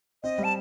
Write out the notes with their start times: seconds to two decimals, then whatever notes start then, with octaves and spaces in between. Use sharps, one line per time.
0.23 C4 D#5
0.38 G3
0.44 A5